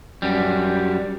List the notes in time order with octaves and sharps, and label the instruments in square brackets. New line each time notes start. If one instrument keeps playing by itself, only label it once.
[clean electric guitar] F#2 G3